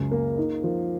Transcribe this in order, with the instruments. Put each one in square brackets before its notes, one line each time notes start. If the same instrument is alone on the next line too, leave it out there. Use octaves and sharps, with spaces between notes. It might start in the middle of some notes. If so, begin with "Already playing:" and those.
Already playing: [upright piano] C#2 F#2 C#3
A#3
D#4
F3